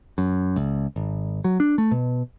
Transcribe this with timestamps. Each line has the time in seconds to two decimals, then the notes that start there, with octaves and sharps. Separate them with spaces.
0.18 F#2
0.56 C#2
0.96 G#1
1.44 F#3
1.60 D4
1.78 A3
1.92 B2